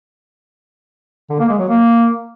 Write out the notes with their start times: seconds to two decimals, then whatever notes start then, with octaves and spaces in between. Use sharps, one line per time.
1.30 D3
1.39 A#3
1.49 G#3
1.59 F#3
1.69 A#3